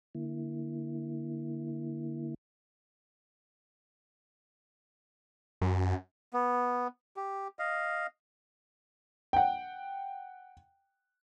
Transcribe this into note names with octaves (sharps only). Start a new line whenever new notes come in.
D3 A#3 E4
F#2
B3
G4
D#5 F5
F#5 G5